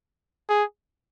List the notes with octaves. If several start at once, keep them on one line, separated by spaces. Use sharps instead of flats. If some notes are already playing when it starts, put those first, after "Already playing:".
G#4